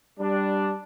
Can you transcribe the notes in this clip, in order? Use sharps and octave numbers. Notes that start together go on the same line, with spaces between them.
G3 D4